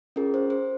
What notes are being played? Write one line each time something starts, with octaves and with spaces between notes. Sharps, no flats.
C#4 F4 G#4 A#4
C5
C5